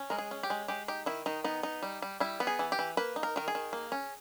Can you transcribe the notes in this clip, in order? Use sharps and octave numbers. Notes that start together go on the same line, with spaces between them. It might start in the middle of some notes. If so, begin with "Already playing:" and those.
Already playing: C#4
G#3 A#4
G#4
C#4
G4
G#3
G#3 G4
D#4 G4
D#3 E4
D#3 D#4
B3 D#4
D#4
G3
G3
G3 E4
B3
G#4
E3
G4
E3
A#3 B4
D#4
A#4
D#3 A#4
G#4
D#3
A#3
C#4